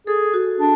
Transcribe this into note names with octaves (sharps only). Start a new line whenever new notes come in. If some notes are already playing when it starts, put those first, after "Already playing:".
G#4 A4
F#4
D4